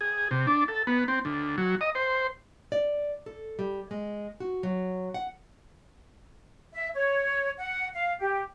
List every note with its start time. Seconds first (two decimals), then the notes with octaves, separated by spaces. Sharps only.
0.01 G#4
0.31 C3
0.47 D4
0.68 A4
0.87 B3
1.08 C4
1.25 D2
1.58 F#3
1.81 D#5
1.95 C5
2.72 D5
3.26 A4
3.59 G3
3.91 G#3
4.40 F#4
4.63 F#3
5.14 F#5
6.73 E5
6.94 C#5
7.58 F#5
7.93 F5
8.19 G4